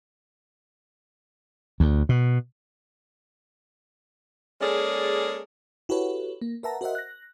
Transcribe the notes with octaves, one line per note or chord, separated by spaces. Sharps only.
D2
B2
G#3 A#3 C#4 G#4 A4 D5
E4 F#4 G4 A4 B4 C#5
A#3
A#4 B4 E5 F#5 A5 A#5
F#4 A#4 C5 D#5 E5 F#5
F#6 A#6